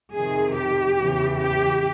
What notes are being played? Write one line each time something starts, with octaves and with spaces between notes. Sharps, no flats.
F2 C3 D#3 G#4
G4
E2 C#3 E3
G4